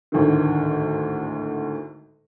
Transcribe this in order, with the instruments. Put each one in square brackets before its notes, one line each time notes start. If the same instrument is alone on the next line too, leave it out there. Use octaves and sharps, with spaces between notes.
[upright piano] G#1 D2 A2 D3 D#3